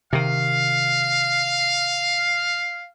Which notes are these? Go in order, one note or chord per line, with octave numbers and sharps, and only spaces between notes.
C3 D#3 F5